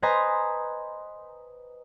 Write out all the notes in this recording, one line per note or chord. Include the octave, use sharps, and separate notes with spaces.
B4 C5 D#5 G#5 A#5